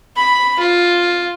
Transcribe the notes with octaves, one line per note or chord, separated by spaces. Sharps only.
B5
F4